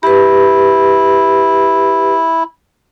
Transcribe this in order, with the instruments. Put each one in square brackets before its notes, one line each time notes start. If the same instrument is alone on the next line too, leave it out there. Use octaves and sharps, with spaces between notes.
[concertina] E4 [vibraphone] G4 B4